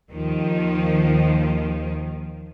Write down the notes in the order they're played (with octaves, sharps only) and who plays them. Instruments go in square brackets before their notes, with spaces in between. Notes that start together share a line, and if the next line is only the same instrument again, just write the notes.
[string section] D#2 D#3 F3